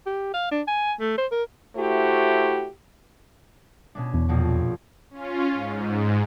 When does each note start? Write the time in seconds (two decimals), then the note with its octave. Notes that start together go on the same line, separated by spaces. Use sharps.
0.06 G4
0.34 F5
0.51 D4
0.68 G#5
1.00 A3
1.18 C5
1.32 A#4
1.77 A3 E4 F#4 G4 C5
3.95 B2 C#4 D4
4.14 E2
4.29 A#1 F2 B2
5.11 C#4 F4
5.54 G#2